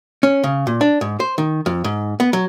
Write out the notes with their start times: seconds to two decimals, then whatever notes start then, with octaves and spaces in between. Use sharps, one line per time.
0.23 C#4
0.44 C#3
0.67 A#2
0.81 D4
1.01 G#2
1.20 C5
1.38 D#3
1.66 F2
1.84 G#2
2.20 B3
2.33 F#3